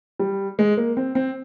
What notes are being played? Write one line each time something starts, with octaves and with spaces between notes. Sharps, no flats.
G3
G#3
A#3
C4
C4